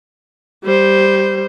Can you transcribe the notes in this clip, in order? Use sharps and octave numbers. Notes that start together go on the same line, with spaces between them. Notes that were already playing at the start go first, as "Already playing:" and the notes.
G3 C5